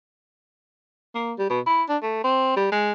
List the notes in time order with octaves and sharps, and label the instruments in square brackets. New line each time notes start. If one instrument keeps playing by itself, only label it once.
[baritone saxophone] A#3
G3
B2
E4
D4
A3
C4
G3
G#3